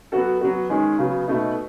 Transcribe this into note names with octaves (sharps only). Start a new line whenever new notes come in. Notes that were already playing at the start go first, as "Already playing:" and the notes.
F#3 B3 F#4 A4
F#3 B3 F#4
D#3 G#3 C#4 G#4
C#3 F#3 B3
B2 A3 D#4